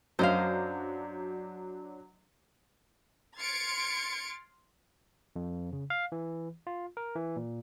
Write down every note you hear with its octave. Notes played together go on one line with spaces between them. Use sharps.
F#2 F#3 D4 C5 D#5 F5
C6 F6 G#6 A6 C#7 D7
F2
C#3
F5
E3
F4
A#4
E3
A#2